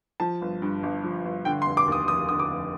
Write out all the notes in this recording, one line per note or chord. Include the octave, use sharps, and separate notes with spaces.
F3 A5
G1
G2
G1
F3
G1
D3 G5
C6
F1
D6
D#2 D#6
F1 D#6
D3 D#6
D6
F1